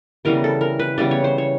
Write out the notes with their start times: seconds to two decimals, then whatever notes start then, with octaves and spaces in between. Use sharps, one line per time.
0.25 C#3 E3 G3 B3 A#4
0.44 A4
0.61 A#4
0.79 B4
0.98 C#3 E3 G3 B3 D5
1.11 C#5
1.24 C5
1.38 C#5